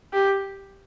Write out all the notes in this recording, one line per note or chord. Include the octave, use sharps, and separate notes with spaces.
G4